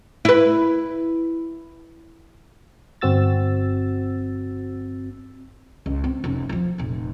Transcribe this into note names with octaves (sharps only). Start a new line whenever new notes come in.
E4 B4
G1 C4 F#4 E6 A6
C#2
C4
F1 C#4
E3 F3
F1 A#2